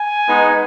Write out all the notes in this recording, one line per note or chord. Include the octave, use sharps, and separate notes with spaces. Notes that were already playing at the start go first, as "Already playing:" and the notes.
Already playing: G#5
G#3 B3 D#4